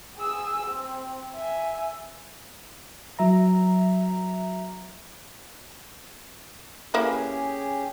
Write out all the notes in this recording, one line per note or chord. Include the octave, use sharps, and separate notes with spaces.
G#4 E6
C4
E5 G#5
F#3 E5 A#5
A#3 C#4 E4 G4 G#4 B4